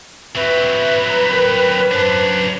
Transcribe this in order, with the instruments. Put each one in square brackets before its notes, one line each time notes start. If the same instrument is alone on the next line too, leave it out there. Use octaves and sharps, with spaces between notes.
[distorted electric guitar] F#3 C4 [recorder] B4 [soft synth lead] E5
[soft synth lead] A#5
A#4
[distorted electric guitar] F#2 D4 [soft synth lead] C5